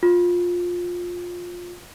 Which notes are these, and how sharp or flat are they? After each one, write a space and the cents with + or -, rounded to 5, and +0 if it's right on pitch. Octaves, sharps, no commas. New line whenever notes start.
F4 +15